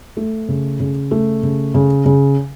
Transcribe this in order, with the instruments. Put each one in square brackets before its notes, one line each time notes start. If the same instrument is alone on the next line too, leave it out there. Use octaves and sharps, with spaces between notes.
[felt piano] A3
C#3
C#3
A3
C#3
C#3
C#3